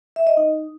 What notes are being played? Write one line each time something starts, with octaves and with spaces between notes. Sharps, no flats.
E5
D#5
D#4